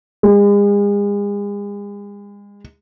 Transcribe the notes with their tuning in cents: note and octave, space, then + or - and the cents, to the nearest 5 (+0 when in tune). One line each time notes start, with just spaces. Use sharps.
G#3 -40